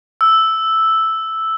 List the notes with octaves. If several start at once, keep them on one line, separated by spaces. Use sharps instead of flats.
E6